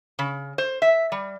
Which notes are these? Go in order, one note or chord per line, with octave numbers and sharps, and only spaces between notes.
C#3
C5
E5
G3